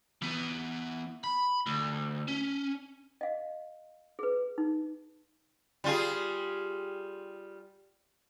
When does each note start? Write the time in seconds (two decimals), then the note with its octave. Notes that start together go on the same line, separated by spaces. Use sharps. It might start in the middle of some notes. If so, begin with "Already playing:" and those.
0.22 E3 B3
1.24 B5
1.66 D2
2.28 C#4
3.21 D#5 F5
4.19 G#4 B4
4.58 D#4
5.84 G3 F4 G#4